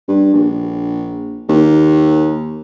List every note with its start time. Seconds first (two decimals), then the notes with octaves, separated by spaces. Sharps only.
0.08 G2
0.34 A#1
1.49 D#2